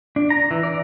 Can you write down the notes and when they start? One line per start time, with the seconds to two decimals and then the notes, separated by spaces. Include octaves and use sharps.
0.16 D4
0.30 A#5
0.51 E3
0.63 D5